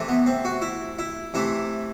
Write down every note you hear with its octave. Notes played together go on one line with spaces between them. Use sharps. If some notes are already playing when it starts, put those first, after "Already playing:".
Already playing: C3 E3 A3
B3
C4
F#4
E4
E4
C3 E3 A3 E4